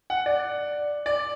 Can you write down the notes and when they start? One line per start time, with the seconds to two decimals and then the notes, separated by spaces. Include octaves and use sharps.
0.10 F#5
0.26 D5
1.06 D5